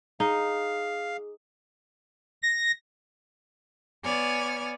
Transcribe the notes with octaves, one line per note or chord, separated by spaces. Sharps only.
D#4 G#4 F5
A#6
B3 C#5 D5 G#5 F6